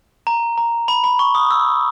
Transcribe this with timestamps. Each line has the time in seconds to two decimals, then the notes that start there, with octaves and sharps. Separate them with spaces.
0.27 A#5
0.58 A#5
0.88 B5
1.04 B5
1.19 C#6
1.35 D#6
1.51 E6